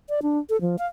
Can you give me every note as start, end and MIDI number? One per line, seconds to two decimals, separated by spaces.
0.09 0.20 74
0.23 0.39 62
0.50 0.60 69
0.61 0.76 53
0.79 0.86 77